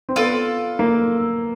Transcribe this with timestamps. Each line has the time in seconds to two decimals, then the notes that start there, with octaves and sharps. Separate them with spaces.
0.09 C4
0.16 B3 F4 A4 D5
0.79 A#3